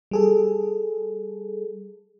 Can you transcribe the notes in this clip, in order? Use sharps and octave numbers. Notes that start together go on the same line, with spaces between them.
G3 G#4 A4